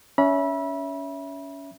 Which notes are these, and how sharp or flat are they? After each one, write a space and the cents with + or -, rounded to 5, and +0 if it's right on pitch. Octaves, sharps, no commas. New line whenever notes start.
C#4 +25 E5 +0 B5 -30